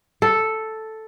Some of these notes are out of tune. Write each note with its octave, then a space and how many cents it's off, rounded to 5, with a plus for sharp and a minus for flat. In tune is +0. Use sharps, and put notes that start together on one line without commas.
A4 +0